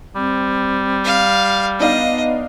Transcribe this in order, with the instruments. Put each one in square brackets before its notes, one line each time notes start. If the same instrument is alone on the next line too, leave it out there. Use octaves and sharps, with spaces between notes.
[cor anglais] G3 [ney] C4
[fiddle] F5
[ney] B3 [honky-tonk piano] D4 D#4 F5 [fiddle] D#5